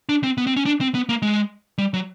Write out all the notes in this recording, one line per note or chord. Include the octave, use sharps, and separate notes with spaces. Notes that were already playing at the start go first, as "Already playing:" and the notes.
D4
C4
B3
C4
C#4
D4
C4
B3
A#3
G#3
G3
F#3